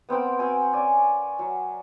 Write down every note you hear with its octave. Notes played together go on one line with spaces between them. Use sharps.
B3 C4 A#4 G5
C4 F#4 G#5
C#4 D5 G#5
F#3